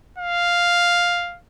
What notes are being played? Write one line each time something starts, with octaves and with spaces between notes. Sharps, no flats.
F5